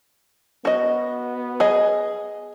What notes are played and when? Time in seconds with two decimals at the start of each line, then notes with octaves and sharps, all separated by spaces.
0.65 B3 F#4 D#5
1.60 G#4 D#5 G#5